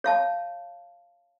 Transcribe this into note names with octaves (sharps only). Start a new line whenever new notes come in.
C#5 F5 A5